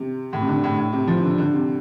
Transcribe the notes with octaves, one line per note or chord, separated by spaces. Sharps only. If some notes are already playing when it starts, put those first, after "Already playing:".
Already playing: C3
A2
C3
D3
A2
A2
C3
F3
D3
D3
C3